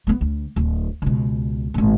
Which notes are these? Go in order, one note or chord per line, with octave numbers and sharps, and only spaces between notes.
A3 B3
D2
D1
C#2 B2
G#1 A#2